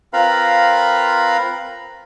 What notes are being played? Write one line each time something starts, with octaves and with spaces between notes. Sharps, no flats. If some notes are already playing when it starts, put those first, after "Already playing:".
C4 F4 A#4 B4 F5 B5